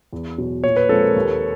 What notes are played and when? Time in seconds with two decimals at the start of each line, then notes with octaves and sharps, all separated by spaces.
0.13 E2
0.38 B2 F#3
0.64 A#2 C#5
0.77 B4
0.89 F3 G#3 C4 A4
1.03 A#4
1.16 D#2